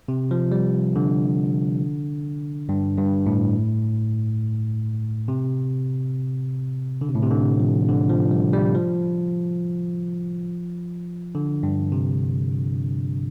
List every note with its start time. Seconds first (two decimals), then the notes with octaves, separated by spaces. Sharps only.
0.08 C3
0.31 F3
0.52 G3
0.96 D3
2.69 G2
2.98 G2
3.26 A2
5.28 C3
7.01 D3
7.09 C3
7.15 A2
7.23 C3
7.31 D3
7.60 F3
7.88 D3
8.10 F3
8.31 G3
8.53 G3
8.75 F3
11.35 D3
11.63 G2
11.92 C3